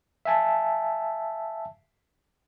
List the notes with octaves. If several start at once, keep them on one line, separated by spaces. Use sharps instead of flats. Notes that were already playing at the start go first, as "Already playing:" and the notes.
E5 F5 G#5 A5